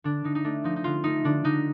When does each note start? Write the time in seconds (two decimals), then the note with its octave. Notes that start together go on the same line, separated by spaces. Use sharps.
0.04 D3 D4
0.24 D3 D#4
0.35 D#4
0.44 A3 D4
0.64 F3 D#4
0.76 D#4
0.84 D3 F4
1.04 A3 D#4
1.24 D3 D4
1.44 D3 D#4